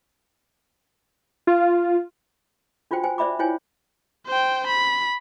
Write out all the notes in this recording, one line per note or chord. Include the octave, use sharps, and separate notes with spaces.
F4
D4 F4 F#4 C5 G5
C5 G5 G#5
C5 D5 E5 B5 D6
E4 F4 C5 C#5 G5 G#5
C5 G5
B5